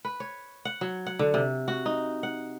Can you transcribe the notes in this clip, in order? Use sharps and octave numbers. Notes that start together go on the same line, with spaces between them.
B4
C#5
F#5
F#3
F#5
D3
C3
F#4
D#4
F#5